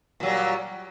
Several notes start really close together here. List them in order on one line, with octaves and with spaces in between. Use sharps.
A#2 F#3 G3